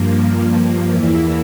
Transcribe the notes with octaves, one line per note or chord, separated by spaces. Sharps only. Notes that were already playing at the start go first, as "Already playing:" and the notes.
Already playing: G2 F3 A#3
E2 E3 A#3 E4